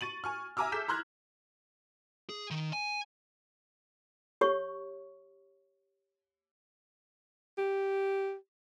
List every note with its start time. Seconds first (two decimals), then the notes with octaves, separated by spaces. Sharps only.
0.01 C#6 A6 D#7 F#7
0.24 G#5 C#6 F6
0.57 E5 G#5 A#5 D6 E6 F6
0.72 G#4 A4 G6 B6 E7
0.88 A#5 C6 F6 F#6 G#6
2.29 G#4
2.51 D#3
2.73 G#5
4.41 G4 C#5 C#6
7.58 G4